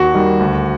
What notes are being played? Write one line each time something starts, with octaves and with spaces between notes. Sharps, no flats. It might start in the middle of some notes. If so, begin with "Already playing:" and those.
Already playing: D#2 F#4
D#3 G3
D2